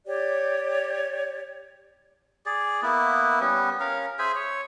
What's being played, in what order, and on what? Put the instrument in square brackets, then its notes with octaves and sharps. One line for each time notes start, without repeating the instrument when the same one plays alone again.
[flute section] G4 C#5 D5
[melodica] G#4 D5
A#3 B3 E4
G3 B3 C#4
C#4 A#4 F5
G#4 C5 E5 G#5
C#5